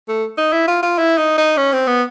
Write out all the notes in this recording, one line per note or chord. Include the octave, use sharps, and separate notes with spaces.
A3
D#4
E4
F4
F4
E4
D#4
D#4
C#4
C4
B3